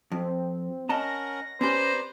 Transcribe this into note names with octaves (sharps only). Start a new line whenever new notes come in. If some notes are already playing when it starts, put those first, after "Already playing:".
F2 C4
C#4 A#4 D#5 F#5 A5 A#5 A#6
C4 C#4 G4 B4 C5 D5 A#5